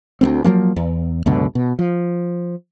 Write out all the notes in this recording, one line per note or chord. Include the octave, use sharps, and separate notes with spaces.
D2 A#3 C4
F3 F#3 G#3 A#3
E2
C#2 F#2 B2 D3
B2
F3